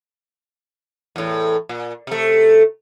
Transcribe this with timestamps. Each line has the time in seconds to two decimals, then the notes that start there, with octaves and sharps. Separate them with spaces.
1.16 E2 A2
1.69 A#2
2.07 C3 A3